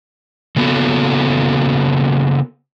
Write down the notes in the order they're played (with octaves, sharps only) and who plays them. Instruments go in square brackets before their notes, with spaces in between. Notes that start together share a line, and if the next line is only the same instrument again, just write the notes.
[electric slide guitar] C#3 A#3 B3 F#4 A4